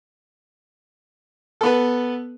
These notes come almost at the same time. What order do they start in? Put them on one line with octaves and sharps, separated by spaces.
A4 B3 B4